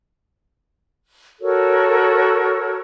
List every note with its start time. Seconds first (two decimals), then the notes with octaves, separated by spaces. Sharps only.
1.40 F#4 A4 A#4 C#5